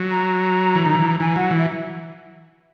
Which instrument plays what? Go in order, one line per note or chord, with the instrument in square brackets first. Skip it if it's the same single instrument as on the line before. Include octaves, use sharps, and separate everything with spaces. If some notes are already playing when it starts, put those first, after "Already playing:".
Already playing: [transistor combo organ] F#3
[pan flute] A#5
[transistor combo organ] E3
D#3
E3
[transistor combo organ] E3 [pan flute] G#5
[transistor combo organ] F#3 [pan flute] F#5
[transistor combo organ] E3
[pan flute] E5